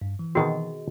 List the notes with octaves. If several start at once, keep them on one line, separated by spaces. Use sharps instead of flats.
G2
E3
B2 D#3 C4 F#4 G#4 D#5